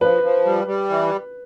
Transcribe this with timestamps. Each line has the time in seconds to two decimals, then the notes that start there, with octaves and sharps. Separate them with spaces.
0.01 F3 B4
0.23 F3
0.45 G3
0.67 G3
0.90 E3